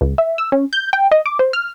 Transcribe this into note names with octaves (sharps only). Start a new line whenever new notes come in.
C#2
E5
E6
C#4
G6
G5
D#5
D6
C5
F6